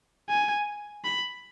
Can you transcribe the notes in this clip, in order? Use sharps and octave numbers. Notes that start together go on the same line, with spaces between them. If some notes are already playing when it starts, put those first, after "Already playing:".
G#5
B5